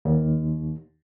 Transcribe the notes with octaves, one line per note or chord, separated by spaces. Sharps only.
D#2